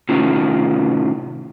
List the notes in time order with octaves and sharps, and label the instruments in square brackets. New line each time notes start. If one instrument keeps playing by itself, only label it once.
[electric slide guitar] A2 C3 D#3 C#4 F4